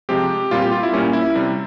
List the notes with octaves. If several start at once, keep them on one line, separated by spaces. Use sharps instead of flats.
C3 F3 G#3 C4 G4
A#2 G3 C4 F4
G4
F4
E4
A#2 G3 A#3 C#4
E4
C3 G3 C4